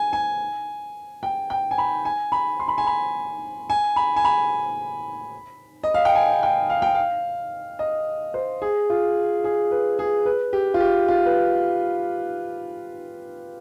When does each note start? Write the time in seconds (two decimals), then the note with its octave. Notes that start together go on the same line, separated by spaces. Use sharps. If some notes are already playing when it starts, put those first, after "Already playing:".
Already playing: G#5
0.13 G#5
1.23 G5
1.50 G5
1.71 G#5
1.78 B5
2.05 G#5
2.32 B5
2.60 C6
2.68 B5
2.78 G#5
2.87 B5
3.70 G#5
3.96 B5
4.16 G#5
4.25 B5
5.83 D#5
5.94 F5
6.05 G5
6.15 G#5
6.43 G5
6.70 F5
6.82 G5
6.94 F5
7.79 D#5
8.34 C5
8.62 G#4
8.90 F4
9.44 G#4
9.71 B4
9.99 G#4
10.25 B4
10.53 G4
10.74 F4
10.80 G4
11.08 F4
11.26 B4